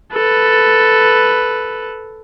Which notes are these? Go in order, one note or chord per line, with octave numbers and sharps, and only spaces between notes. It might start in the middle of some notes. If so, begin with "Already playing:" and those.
A4 B4